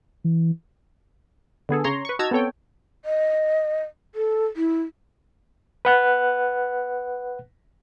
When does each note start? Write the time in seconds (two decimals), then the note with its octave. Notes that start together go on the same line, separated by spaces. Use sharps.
0.24 E3
1.69 D3 B3 G#4 A4
1.84 C#3 C#5 A#5 C6
2.05 B4 C#6
2.19 D#4 F#4 A5 A#5 E6 G#6
2.31 B3 C4 A4 C#5 G5
3.05 D#5
4.15 A4
4.56 E4
5.85 B4 F#5 F#6